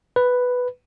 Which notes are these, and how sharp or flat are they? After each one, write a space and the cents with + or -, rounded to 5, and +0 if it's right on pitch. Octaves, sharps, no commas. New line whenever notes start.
B4 +5